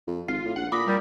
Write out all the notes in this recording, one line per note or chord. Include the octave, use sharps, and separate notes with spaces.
F2
G#1 F4 C7
A2
A#1 F#5
A#2 B5 D6 D#6 A#6
G3 A#4